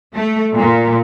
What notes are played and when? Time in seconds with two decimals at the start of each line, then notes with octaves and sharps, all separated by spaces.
0.13 A3
0.55 A#2